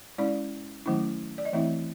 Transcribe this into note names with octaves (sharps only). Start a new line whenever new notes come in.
G#3 C#4 E4 D5
D#3 F#3 A3 C#4 E4
D5
D#5
E3 A3 C4 E4 E5